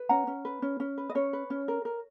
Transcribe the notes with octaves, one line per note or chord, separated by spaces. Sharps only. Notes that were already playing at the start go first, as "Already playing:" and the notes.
Already playing: B4
C#4 F#5 A#5
C#4
B4
C#4
C#4
B4
D#5
C#4 C#5
B4
C#4
A#4
A#4